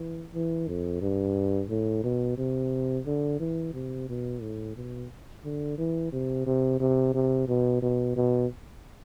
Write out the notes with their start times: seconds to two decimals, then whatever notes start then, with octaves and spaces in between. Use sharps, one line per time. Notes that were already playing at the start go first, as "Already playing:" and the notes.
Already playing: E3
0.34 E3
0.68 F2
1.02 G2
1.70 A2
2.04 B2
2.38 C3
3.06 D3
3.40 E3
3.74 C3
4.09 B2
4.42 A2
4.76 B2
5.45 D3
5.78 E3
6.13 C3
6.47 C3
6.80 C3
7.15 C3
7.49 B2
7.82 B2
8.16 B2